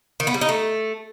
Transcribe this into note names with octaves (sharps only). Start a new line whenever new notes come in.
D#3
B3
G3
D#4
A3